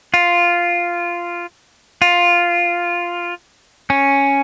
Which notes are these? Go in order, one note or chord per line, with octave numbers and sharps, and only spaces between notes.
F4
F4
C#4